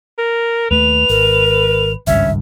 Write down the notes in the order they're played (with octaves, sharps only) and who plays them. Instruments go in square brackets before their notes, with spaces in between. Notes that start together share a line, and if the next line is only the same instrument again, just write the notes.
[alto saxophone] A#4
[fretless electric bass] D#2 A3 [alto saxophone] B4 [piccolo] F7
[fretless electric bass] G#1 [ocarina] A#4
[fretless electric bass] G#1 C#2 G2 [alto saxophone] C#4 [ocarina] E5